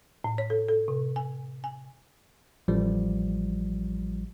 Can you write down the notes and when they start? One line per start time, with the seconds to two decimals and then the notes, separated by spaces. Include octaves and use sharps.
0.24 A2
0.38 C#5
0.50 A4
0.68 A4
0.88 C3
1.16 G#5
1.64 G#5
2.68 A1 F3 G3